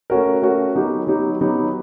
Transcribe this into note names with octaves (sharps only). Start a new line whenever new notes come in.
A3 C#4 F#4 A#4
A3 C#4 F#4 A#4
F#3 B3 D#4 G4
F#3 B3 D#4 G4
F#3 B3 D#4 G4